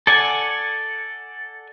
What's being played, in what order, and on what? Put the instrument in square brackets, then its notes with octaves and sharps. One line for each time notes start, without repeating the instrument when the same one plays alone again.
[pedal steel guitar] A4 D5 F#5 G#5